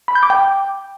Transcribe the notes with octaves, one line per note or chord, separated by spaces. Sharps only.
B5
G6
D6
G5